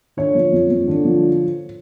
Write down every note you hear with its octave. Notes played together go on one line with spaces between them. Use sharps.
D3 C#5
F3
F2
F2
D3
F3